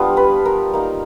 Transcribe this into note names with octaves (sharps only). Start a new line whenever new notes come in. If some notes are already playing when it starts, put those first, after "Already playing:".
Already playing: G3 B3 D4 F4
B4
A#4
A#3 D#4